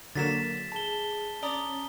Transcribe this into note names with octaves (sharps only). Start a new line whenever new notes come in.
D3 F#3 A#3 A6 B6 E7
G#4 A5 G7
C#4 D5 A#5 D#6 A6 G7